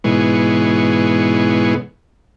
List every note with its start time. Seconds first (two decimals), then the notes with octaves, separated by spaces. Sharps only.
0.04 G#2 B2 E3 G#3 B3 C#5